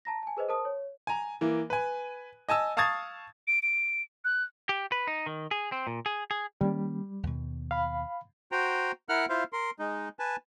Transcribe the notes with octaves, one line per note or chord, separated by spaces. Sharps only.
A5 A#5 A#6
G#5 A5
G#4 B4 C5 D#5
A#4 C5 A5 D#6
C#5
G#5 A#5
E3 A#3
B4 G#5
D#5 G#5 A5 E6
F5 A5 C#6 D#6 G#6 A6
D7
D7
F#6
G4
B4
D#4
D#3
G#4
C4
A#2
G#4
G#4
D#3 G3 A#3 C#4
D#2 B2
F5 B5
F#4 C5 G5 A#5
E4 A#4 F#5 F6 F#6
E4 F4 C5 F5
A#4 C6
G#3 D#4
B4 G#5 A5